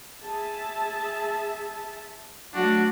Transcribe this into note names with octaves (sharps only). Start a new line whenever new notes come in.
G#4 E5 A5
F#3 A3 D4 F#4